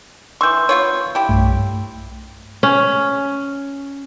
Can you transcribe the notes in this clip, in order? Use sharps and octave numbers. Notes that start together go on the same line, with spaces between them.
E3 C6 C#6 E6 G6
B3 F4 C#5
E4 G4
B1 G2 A3
C#4